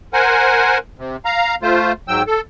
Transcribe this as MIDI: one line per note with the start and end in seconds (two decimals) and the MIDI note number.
0.13 0.78 70
0.13 0.78 72
0.13 0.78 78
0.13 0.78 80
0.99 1.16 48
1.25 1.55 77
1.25 1.55 82
1.62 1.92 57
1.62 1.92 65
1.62 1.92 72
2.08 2.22 44
2.08 2.22 54
2.08 2.22 79
2.08 2.22 88
2.27 2.41 69